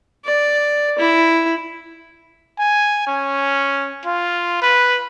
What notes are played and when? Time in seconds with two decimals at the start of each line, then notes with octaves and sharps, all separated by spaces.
0.25 D5
0.98 E4
2.59 G#5
3.07 C#4
4.05 F4
4.62 B4